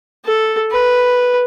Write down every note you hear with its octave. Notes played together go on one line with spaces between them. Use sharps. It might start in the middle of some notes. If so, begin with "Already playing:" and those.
A4
B4